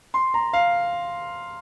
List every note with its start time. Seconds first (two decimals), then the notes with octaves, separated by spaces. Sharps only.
0.14 C6
0.34 A#5
0.53 F5